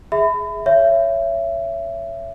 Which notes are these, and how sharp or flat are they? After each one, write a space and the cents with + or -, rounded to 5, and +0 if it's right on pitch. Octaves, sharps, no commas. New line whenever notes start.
G#4 +0 E5 -15 B5 +30
C#5 +0 E5 +25